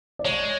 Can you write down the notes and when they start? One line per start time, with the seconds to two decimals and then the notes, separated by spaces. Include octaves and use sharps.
0.19 D5
0.25 G#3 C#5